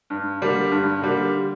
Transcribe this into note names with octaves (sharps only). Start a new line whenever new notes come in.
G2
D3 G3 A#3
G2
D3 G3 A#3